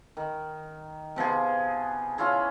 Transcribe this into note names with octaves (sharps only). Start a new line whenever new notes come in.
D#3
C3 F3 B3 G#4
C#4 E4 F4 G#4